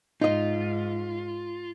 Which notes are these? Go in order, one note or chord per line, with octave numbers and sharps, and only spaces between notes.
G#2 D#4 F4 D#5